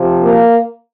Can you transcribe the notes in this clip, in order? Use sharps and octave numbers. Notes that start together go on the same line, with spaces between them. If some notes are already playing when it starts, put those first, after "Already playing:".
Already playing: C3 F3
A#3